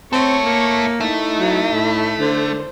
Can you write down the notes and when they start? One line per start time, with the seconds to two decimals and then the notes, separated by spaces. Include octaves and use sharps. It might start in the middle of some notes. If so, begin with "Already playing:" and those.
0.13 C4 E4 A4 C#5 C#6
0.45 A#3
1.00 A3 D#4 E4
1.40 F#3
1.74 A2
2.20 D3 C5